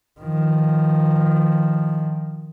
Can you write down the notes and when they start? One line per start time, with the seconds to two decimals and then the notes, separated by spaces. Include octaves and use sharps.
0.21 D#3 F3